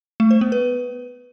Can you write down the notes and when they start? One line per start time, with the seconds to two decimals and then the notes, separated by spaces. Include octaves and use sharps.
0.20 A3
0.31 C5
0.41 B3
0.52 B4